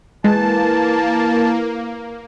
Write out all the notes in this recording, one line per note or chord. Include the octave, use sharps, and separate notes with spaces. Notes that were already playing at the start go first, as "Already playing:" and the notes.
E3 G#3 A#3 A5